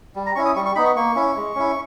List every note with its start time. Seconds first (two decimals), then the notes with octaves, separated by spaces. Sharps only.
0.15 G3
0.26 A#5
0.35 C#4 E4 C#6
0.45 D#6
0.55 G3 C#6
0.66 C#6
0.75 B3 D#4 B5
0.86 C#6
0.96 A#3 C#6
1.15 C#4 E4
1.36 G#3
1.56 C#4 E4